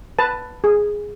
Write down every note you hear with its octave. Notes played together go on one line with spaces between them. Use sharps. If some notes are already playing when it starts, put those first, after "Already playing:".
B4 A5
G#4